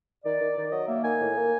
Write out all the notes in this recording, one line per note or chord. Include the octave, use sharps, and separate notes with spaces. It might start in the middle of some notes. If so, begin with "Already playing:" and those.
D#3 D5
D#3
D#3
F#3 D#5
A#3 E5
D#3 G#5
A2
A#3